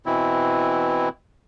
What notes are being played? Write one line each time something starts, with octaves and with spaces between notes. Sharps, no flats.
B2 E3 C4 E4